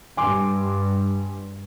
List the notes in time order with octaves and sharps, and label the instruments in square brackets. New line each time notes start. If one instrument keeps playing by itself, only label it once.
[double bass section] G2 [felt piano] G#5 C6 D6